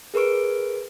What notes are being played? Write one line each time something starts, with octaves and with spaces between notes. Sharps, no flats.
G#4 A#4 B4 C#6 D7